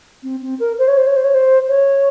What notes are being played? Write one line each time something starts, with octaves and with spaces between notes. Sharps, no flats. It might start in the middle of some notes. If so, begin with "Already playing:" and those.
C4
C4
A#4
C5
C#5
C5
C#5
C5
C#5
C5
C#5